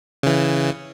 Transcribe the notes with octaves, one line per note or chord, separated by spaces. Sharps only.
C#3 E3